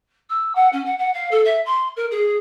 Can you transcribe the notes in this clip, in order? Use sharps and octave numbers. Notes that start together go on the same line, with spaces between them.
E6
F#5
C#4
F#5
F#5
F5
A4
E5
C6
A#4
G#4